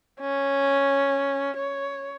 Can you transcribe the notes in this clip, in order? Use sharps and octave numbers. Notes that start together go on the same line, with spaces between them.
C#4
C#5